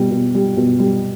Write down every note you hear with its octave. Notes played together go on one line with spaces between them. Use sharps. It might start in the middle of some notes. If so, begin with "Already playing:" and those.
Already playing: B2 G3
B2
G3
B2
G3